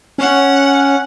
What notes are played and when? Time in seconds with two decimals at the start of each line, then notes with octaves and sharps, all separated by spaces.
0.18 C#4 F#5